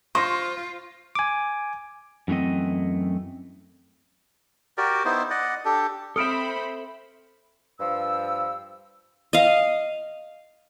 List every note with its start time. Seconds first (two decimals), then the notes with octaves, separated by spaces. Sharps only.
0.15 F4 C5 C#6 A#6
1.15 G#5 D6
2.28 F#2 E3 A3 C4 D#5
4.78 F#4 G4 A#4 D5
5.05 B3 D#4 E4 C5
5.30 D5 D#5 F#5
5.65 D4 G4 A4
6.16 C4 A4 C5 E5 B5 D#6 F6 D7
7.79 G2 F3 E6
9.33 D#5 F5